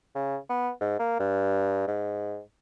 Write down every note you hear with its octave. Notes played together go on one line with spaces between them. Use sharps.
C#3
B3
G#2
A#3
G2
G#2